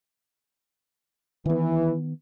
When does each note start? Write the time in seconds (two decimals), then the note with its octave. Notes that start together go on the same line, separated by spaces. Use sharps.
1.46 D#3 E3 B3